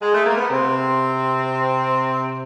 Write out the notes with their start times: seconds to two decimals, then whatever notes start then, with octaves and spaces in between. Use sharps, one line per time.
0.02 G#3
0.14 A3
0.26 A#3
0.37 B3
0.50 C3 C4